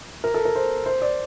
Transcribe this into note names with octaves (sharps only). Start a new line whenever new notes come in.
A#4
A4
A#4
C5
C5
D5